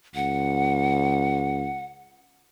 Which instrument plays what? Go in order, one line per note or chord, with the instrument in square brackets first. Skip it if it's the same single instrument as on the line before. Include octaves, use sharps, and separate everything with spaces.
[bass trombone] C#2 [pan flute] F#5